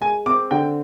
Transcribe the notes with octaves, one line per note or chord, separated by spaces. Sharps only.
G#3 G#5
C4 D6
D3 G5